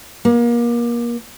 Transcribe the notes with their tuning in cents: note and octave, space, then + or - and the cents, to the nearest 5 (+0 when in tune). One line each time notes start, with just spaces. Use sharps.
A#3 +30